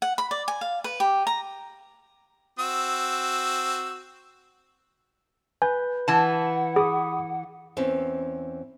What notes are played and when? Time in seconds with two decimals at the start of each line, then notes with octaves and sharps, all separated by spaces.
0.02 F#5
0.18 B5
0.31 D5
0.48 G#5
0.61 F5
0.84 B4
1.00 G4
1.27 A#5
2.59 C4 F#4 E6
5.62 B4 G#5 G6
6.08 E3 F#5 A5
6.76 G#4 B5 D6 D#6
7.77 E2 C4 C#4